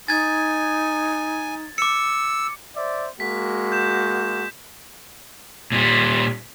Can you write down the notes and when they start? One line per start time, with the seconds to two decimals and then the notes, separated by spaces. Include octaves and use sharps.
0.08 D#4 G#5 G#6 A6
1.78 D6 E6 C#7
2.75 C5 D5 E5
3.20 G#3 A#3 F#4 B6
3.72 G6 E7
5.72 A#2 G3